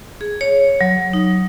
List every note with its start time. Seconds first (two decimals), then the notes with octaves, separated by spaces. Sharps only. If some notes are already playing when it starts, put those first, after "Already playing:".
0.21 G#4
0.41 C#5
0.81 F#3
1.13 D#4